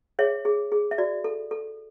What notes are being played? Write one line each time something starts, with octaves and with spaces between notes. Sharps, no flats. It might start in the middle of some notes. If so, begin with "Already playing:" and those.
G#4 C#5 E5
G#4
G#4
E5
F#4 D5
A4
A4